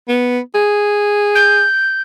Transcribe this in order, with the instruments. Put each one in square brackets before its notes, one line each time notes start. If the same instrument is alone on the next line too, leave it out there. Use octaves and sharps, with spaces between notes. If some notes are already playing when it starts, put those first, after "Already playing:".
[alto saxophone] B3
G#4
[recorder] G6